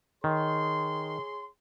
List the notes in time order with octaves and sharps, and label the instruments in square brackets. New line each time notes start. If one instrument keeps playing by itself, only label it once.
[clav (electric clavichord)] D#3 [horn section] G#4 C#5 C6